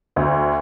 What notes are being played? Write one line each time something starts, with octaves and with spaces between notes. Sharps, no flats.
D2